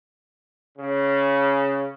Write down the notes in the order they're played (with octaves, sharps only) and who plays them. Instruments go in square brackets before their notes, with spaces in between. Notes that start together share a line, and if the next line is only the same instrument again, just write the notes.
[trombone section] C#3